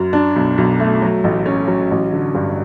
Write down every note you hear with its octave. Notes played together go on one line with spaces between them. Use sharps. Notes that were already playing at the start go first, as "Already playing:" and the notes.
Already playing: F#2
D4
B1
B1
A3
F#3
A1
C#4
F#3
A1
D3
G2